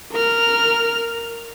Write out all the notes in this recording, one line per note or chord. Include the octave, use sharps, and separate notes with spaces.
A#4 F6